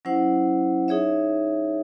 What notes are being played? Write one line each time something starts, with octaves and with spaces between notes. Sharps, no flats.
F#3 C#4 E4 C5 F#5
D#4 G#4 C#5 E5